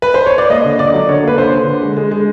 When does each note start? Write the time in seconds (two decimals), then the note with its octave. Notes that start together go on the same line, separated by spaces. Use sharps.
0.02 B4
0.14 C5
0.26 C#5
0.38 D5
0.50 A#3 D#5
0.65 D3
0.79 D3 D5
0.94 F#3
1.09 D3 C#5
1.23 A#3 B4
1.38 D3 C5
1.53 D3
1.67 D3
1.82 G#3
1.97 G#3
2.11 G#3